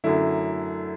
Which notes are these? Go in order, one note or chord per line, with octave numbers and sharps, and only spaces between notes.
F#2 D3 F#3 A3 E4